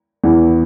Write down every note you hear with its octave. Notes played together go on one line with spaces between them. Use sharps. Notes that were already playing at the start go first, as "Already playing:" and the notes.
E2 E3